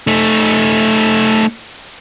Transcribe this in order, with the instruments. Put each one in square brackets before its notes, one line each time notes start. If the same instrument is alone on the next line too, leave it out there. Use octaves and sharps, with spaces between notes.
[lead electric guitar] A3 D#4